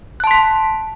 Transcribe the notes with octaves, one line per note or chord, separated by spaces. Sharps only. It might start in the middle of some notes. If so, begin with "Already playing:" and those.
A5 C6 F#6 B6